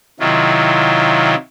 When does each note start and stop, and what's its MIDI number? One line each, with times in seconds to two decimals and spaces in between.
0.20 1.35 48
0.20 1.35 51
0.20 1.35 54
0.20 1.35 64
0.20 1.35 65